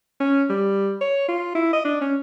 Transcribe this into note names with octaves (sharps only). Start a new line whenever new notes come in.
C#4
G3
C#5
F4
E4
D#5
D4
C#4